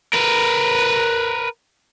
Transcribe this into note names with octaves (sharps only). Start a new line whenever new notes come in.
A#4 B4